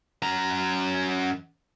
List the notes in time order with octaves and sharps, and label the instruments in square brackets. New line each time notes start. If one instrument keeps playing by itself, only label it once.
[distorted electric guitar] F#2 A#5